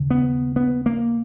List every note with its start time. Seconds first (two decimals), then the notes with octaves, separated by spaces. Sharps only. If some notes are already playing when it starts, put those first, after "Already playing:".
Already playing: D#2 C#3
0.11 B3
0.56 B3
0.86 A#3